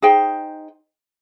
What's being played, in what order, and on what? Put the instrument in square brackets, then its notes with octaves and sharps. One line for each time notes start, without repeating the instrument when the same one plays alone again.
[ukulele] D#4 G#4 C5 G5